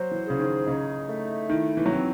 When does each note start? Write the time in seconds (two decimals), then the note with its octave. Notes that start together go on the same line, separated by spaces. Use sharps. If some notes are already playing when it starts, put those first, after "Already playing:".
Already playing: F#3 C5
0.11 E3
0.26 C#3 G#4
0.39 D#3
0.67 C#3 D#4
1.08 A3
1.49 D#3 E4
1.77 E3
1.86 F#3
1.91 E3 C4